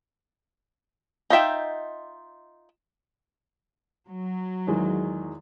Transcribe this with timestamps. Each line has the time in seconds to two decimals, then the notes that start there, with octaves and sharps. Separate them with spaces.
1.30 D#4 F4 E5 G5
4.06 F#3
4.67 E2 D#3 G#3